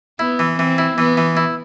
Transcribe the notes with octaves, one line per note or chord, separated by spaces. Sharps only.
B3 E4
E3
E3 C4
E4
E3 B3
E3
E4